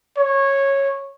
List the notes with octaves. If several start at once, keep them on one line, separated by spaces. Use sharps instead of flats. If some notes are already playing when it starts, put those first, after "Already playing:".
C#5